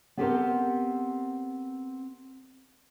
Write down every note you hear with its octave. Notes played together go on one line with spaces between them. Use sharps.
B3 C4 G4 A4 A#4 C5